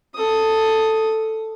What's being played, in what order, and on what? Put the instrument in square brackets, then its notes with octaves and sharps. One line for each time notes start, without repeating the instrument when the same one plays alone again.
[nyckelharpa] A4 D#6